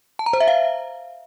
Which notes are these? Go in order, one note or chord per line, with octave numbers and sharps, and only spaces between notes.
A5
A#5
C5
E5
F5